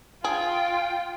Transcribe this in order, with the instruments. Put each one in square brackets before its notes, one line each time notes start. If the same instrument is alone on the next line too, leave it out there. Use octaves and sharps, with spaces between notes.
[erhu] F4 [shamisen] G#4 [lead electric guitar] G5